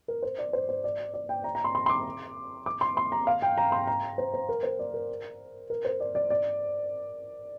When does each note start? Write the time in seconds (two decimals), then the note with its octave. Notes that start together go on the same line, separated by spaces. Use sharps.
0.08 A#4
0.23 C5
0.39 D5
0.53 C5
0.69 C5
0.84 D5
1.14 D5
1.29 G5
1.44 A#5
1.55 A#5
1.64 C6
1.75 C6
1.86 C6
1.90 D6
2.66 D6
2.81 C6
2.97 C6
3.12 A#5
3.27 F5
3.42 G5
3.58 A#5
3.72 C6
3.87 A#5
4.18 C5
4.34 C5
4.49 A#4
4.63 C5
4.79 D5
4.94 A#4
5.70 A#4
5.85 C5
6.00 D5
6.15 D5
6.30 D5